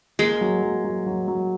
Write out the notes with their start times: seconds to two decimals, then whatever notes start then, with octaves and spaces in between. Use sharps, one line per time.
0.19 G#3 A#3
0.41 F#3
0.63 F#3
0.84 F#3
1.06 F#3
1.28 F#3